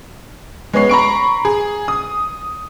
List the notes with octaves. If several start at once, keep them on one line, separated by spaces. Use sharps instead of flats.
G#3 B3 C#5 C7
A#5 B5 C#6 D7
G#4
D#6